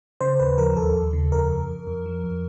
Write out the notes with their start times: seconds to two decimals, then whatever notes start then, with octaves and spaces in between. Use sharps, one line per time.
0.21 C#3 C5
0.40 D#2 B4
0.58 F3 A#4
0.76 D#2 A4
0.95 D#2
1.13 C#3
1.31 F2 A#4
1.50 F2
1.69 F2
1.87 F2
2.06 F3
2.24 F2